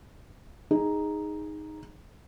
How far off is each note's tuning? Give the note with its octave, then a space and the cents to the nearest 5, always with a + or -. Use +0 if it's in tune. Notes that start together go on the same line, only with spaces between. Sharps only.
D#4 +0 G#4 -10